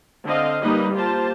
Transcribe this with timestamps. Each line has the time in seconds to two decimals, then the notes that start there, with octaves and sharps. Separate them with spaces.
0.25 D3 C4 D#5 F5
0.61 G3 A#3 D#4 B4 D#5
0.94 A#3 F4 G4 C5 A5